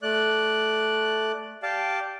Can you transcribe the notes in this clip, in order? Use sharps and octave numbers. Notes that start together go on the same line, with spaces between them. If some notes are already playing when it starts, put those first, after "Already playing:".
A3 D5 F#6
G4 D5 F5 A5